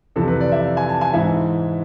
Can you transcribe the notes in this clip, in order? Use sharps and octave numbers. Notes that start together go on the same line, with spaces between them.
F2 C3 E3 A4
B4
D5
E5
F5
G#5
A5
G#5
G#2 E3 E5